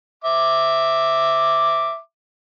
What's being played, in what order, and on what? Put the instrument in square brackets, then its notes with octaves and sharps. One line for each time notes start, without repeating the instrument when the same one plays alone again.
[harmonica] E5 D6